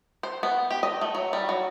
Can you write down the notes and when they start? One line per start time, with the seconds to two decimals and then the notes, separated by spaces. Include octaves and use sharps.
0.23 C5
0.43 B3
0.71 G4
0.83 D#5
1.01 A3
1.15 F#3
1.33 G3
1.49 F#3